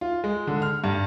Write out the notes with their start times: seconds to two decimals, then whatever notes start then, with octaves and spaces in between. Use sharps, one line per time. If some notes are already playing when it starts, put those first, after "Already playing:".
0.01 F4
0.24 G#3
0.47 D3
0.62 F6
0.84 G2